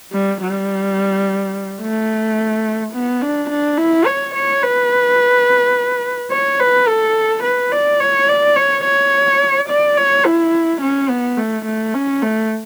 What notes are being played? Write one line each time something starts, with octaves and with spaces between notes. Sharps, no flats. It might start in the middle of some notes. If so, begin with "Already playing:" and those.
G3
G3
A3
B3
D4
D4
E4
C#5
C#5
B4
C#5
B4
A4
B4
D5
C#5
D5
C#5
C#5
D5
C#5
E4
C#4
B3
A3
A3
C#4
A3